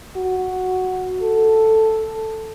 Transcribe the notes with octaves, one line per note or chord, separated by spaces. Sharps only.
F#4
A4